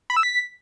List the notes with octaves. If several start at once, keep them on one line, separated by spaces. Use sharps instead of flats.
B5
E6
B6